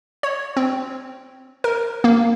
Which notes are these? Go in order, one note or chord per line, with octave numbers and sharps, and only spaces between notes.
C#5
C4
A#4
A#3